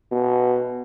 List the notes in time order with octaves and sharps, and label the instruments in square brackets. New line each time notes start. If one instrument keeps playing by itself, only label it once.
[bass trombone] B2